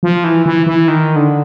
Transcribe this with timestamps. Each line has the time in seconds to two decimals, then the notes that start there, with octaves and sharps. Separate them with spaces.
0.03 F3
0.24 E3
0.46 E3
0.66 E3
0.88 D#3
1.16 D3